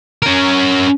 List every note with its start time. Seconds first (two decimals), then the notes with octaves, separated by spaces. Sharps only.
0.22 C#4 A#4